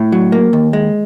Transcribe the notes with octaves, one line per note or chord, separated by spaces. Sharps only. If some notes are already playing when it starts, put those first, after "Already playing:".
Already playing: A2
F#3
A#3
D#2
G#3